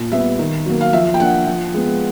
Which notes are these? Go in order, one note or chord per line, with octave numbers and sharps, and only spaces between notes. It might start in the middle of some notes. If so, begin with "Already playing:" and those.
Already playing: A#2
G3 B3 E5
D#3
F#3 A#3
F5
F3 E5
G5
A#3 D4 F#5
F3
G#3 B3